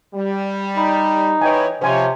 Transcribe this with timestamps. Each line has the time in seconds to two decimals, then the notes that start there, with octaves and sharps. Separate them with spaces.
0.14 G3
0.77 D#4 B5
1.41 E3 C#5 D#5 G5 G#5
1.82 C3 F3 C#4 C5 C#5 G#5 C6